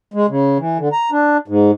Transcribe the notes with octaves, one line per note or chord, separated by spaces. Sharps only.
G#3
C#3
E3
D3
A#5
D4
G#2